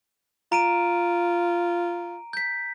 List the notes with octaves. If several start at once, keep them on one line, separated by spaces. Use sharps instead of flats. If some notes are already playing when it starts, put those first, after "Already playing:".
F4 A#5 D7 D#7
G6 B6